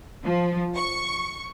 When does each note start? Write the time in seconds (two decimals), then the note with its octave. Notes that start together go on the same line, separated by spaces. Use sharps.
0.23 F3
0.76 C#6